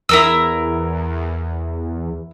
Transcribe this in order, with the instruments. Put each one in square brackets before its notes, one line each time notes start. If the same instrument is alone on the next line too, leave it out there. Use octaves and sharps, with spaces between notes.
[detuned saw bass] E2 [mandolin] E4 A#4 E6